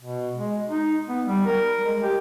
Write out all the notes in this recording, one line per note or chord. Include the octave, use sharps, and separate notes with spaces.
B2
G#3
D#4
B3
G3
A#4
G#3
G4